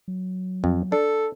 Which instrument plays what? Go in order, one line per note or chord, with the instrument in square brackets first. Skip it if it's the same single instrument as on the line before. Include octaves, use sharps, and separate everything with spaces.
[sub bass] F#3
[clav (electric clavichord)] F2
[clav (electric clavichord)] D4 [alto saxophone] A4